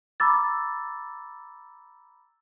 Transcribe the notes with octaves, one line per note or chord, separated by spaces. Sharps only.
A#5 B5 D6 E6 A6